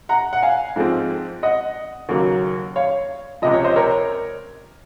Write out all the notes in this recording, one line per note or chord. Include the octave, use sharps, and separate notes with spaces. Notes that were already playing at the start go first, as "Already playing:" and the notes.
F#5 A#5
F#5
F5 G#5
G#2 F3 G#3 C4
D#5 F#5
D#2 C#3 F#3 A#3
C#5 F5
C#2 C3 F3 D#5
C#5
C5 D#5
A#4 C#5